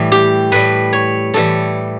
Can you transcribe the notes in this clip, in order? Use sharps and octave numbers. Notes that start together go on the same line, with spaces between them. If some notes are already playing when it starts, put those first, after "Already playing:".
Already playing: A2 E3 G3
G4
A2 G3 B4
C#5
A2 E3 G3 A4